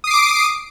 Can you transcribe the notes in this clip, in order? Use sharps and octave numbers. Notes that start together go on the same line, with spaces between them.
D6 D#6 C7 D7